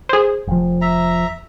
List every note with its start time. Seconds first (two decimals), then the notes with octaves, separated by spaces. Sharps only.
0.09 G#4 C5
0.47 F1 F3
0.82 E5 A#5